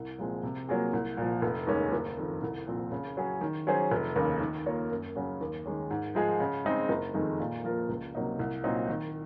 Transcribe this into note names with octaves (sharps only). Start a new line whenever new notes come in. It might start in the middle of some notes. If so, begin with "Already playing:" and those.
Already playing: C2
A#2 F3 G#3 C4
C3
F#3 A#3 F4 G#4
C2
A#2 F3
F1
D#2 D#3 G#3 C#4
F#1
F2 D#3
C2
A#2 F3 C4
C#3
F#3 C#4 G#4
D#3
F#3 C#4 G#4 C5
F1
D#2 C#3
D#3
A#3 F4 A#4 C#5
F#2
C#3 F#3 C#4 F#4
D#2
D#3 G#3 C#4
G#2
F3 G#3 D#4 G#4
C#3
G#3 C4 D#4
F#1
F2 D#3 G#3 D#4
A#2
F3 A#3 F4 A#4
C#2
C3 F#3 A#3 D#4
C2
A#2 F#3 C4 D#4
D#3